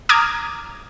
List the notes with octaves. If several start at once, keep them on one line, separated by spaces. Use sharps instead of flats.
A#5 D6 D#6 F6 G#6